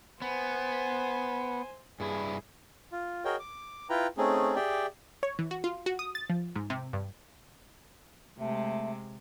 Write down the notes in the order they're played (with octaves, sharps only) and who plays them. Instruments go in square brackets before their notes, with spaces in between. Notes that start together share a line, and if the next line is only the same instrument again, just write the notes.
[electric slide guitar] B3 [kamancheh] C5 G#5
[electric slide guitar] G2 E4 [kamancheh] G#4
[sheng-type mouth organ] F4
F#4 G#4 A#4 C#5 D#5 G5
D6
E4 F4 B4 G5 A#5
A3 C4 C#4 D#4 G#4
G4 G#4 D5 E5 G5
[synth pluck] C#5
E3
F#4
F4
F#4
D#6
A6
F3
G#2
C3
G2
[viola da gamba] C3 G#3 [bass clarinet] A3